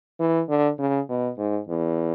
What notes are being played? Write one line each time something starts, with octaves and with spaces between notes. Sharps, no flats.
E3
D3
C#3
B2
G#2
E2